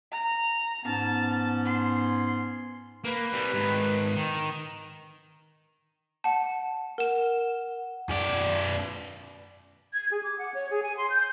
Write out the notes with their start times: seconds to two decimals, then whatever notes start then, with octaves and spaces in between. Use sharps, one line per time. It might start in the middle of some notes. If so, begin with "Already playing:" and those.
0.11 A#5
0.85 G#2 B3 C#4 A5
1.65 C6
3.04 A#3 B4
3.33 G3 C4
3.54 G#2 D#3
4.16 D#3
6.24 F#5 A5
6.98 A#4 F#5 E7
8.09 F#2 D5
9.94 G#6
10.11 G#4
10.23 D6
10.38 F#5
10.54 C#5
10.71 G#4
10.83 G#5
10.97 C6
11.10 G6